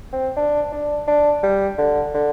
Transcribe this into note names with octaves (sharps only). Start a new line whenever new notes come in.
C4
D4
D4
D4
G3
D3
D3